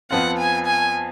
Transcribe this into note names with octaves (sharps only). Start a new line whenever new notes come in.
F2 F3 B3 F4 F#5
G#5
G#5